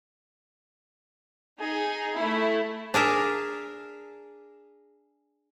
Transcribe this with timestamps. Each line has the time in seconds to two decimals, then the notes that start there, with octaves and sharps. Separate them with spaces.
1.60 D#4 G#4
2.16 A3 E4
2.94 D4 G#4 A#4 E5